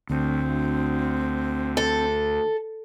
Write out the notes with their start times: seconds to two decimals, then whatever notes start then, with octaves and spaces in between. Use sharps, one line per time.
0.10 D2 C4
1.77 A4